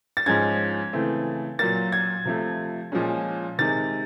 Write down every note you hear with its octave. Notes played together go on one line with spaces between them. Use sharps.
A6
G#2 F3 G#3 C#4 G#6
C#3 E3 A3 C4
A#2 F#3 A#3 A6
G#6
C3 F3 A3
A#2 F3 G#3 C#4
C3 D#3 G#3 A6